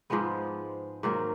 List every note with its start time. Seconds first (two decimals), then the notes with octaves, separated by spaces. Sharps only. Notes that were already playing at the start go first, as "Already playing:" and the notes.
0.10 G#2 F3 G#3 B3
1.03 G#2 D#3 F#3 A#3